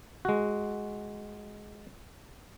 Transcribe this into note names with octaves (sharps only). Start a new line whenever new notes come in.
G#3 F#4